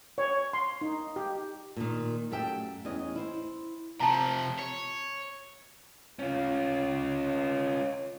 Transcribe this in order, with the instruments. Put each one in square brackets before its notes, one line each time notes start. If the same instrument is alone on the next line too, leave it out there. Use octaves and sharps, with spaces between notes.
[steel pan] C#5
C6
D#4
G4
[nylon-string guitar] A#2 D#3
F#2 A3 G4 E5 G5
E2 C#4 D#5
E4 C5
[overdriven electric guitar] C3 F3 [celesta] A5 A#5
[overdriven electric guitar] C#5
[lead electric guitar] C#4 F4